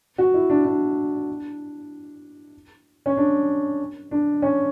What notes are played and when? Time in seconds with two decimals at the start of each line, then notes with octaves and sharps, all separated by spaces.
0.18 F#4
0.34 E4
0.50 D4
0.65 D4
3.06 C#4
3.17 D4
4.11 D4
4.42 C#4